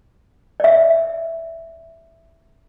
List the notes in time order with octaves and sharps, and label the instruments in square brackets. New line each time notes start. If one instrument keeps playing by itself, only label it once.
[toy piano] D5 E5